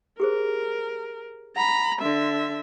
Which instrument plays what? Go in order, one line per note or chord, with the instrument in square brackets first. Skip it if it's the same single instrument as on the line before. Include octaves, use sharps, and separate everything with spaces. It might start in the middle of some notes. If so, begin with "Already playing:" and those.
[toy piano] G4 G#4 C5 [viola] A#4
[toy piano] F#5 [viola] A#5 B5
[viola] D3 E5